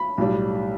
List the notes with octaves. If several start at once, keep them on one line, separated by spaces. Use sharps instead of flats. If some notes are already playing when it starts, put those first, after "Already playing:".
Already playing: B5
B1 A2 G3